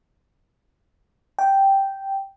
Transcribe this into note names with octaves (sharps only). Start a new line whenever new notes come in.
G5